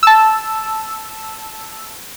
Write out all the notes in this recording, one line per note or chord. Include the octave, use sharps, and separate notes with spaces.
A5 E6